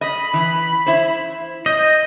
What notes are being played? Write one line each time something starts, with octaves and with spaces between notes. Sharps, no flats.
D#5 B5
E3
E4 C5
D#5 G6